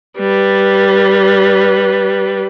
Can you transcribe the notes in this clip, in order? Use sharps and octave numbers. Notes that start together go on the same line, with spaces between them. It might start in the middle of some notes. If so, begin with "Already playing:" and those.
G3 B4